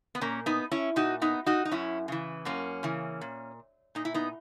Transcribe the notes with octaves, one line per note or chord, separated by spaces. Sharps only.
B3
A#2 A#3 C#4
B3 D#4
C#4 E4
A#2 D#4 F#4
B3 D#4
D#4 F#4
D#4
F#2 C#4 E4
C#3 E3
F#2 A#3 C#4
C#3 E3
A#2
A#2 D#4
E4
B3 D#4